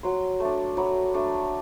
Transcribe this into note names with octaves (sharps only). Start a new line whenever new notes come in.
F#3 C6
A3
D4
F#3 B5
A3 D4